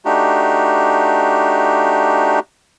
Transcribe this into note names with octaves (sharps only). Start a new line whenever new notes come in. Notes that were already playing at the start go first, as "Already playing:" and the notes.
A3 D4 D#4 F#4 G4